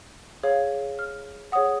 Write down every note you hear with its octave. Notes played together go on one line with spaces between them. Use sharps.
G#4 C#5 F5
F6
G#4 C#5 F#5 D#6